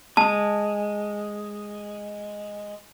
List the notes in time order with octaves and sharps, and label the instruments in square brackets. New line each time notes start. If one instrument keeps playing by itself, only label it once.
[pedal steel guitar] G#3 [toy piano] A5